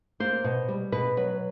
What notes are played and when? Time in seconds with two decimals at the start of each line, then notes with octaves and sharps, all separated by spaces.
0.20 A#3 C5
0.44 B2
0.68 G3
0.92 B2 B4
1.17 F#3 B4